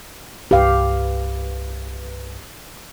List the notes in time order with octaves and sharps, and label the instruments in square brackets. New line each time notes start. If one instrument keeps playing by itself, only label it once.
[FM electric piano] C2 G2 B4 [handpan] G4 F5